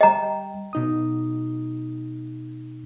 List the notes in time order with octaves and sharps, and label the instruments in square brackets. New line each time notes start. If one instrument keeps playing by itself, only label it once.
[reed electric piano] G3 G5 [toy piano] D#5 A#5
[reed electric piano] B2 D#4 D#6